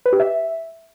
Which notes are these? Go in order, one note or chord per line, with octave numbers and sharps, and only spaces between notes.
B4
G4
E5